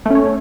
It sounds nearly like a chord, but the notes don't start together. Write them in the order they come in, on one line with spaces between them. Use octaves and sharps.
A3 C#4 C#5